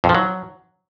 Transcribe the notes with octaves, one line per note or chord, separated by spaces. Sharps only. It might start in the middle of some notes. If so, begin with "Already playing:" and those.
F2
F3
F#3